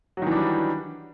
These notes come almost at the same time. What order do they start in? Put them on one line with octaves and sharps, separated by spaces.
F#3 D#3 E3 D4 G3